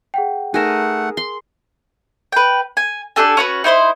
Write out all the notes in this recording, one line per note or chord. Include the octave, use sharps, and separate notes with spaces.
G#4 F#5 G5
A3 D#4 G#4 A#4 F#5 E7
C6
B4 G5
G#5
D4 G4 A4 G#5
C#4 F#4 B4
D#4 E4 C5 C6